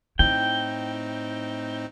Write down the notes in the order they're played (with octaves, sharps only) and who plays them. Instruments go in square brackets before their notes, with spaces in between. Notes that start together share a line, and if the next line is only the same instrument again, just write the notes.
[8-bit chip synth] A2 C4 D#4 [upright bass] E4 [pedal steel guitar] G5